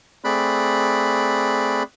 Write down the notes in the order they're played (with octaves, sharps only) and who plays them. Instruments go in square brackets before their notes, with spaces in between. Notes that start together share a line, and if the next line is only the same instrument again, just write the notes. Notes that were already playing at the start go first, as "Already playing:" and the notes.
[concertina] A3 C4 G#4 D5 B5 F#6